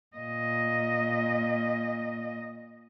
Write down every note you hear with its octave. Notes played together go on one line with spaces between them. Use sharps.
A#2 D#5